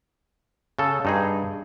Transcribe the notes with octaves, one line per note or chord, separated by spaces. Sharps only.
C#3 A4
G2 D#4 G#4